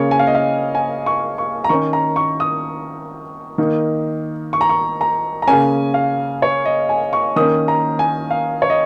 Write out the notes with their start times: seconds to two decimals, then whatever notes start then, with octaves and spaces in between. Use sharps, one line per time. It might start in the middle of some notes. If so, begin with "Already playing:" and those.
Already playing: C#3 A#3 C#4 C#5
0.11 G#5
0.19 F5
0.27 D#5
0.35 F5
0.75 G#5
1.06 C#6
1.38 C#6
1.64 A#5
1.69 D#3 C#4 C#6
1.93 A#5
2.16 C#6
2.40 D#6
3.58 D#3 A#3 D#4
4.53 C#6
4.61 A#5
4.69 C#6
5.01 A#5
5.42 A#5
5.47 C#3 A#3 C#4 G#5
5.94 F5
6.42 C#5
6.65 D#5
6.89 G#5
7.13 C#6
7.36 D#3 A#3 C#4 D#6
7.68 A#5
7.99 G#5
8.31 F5
8.62 C#5
8.70 D#5